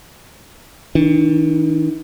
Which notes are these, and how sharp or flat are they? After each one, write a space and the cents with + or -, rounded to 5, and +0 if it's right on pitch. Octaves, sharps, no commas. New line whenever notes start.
D#3 +45 D4 +10